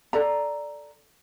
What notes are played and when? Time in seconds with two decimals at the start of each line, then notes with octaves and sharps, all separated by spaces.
0.13 A4 D5 A#5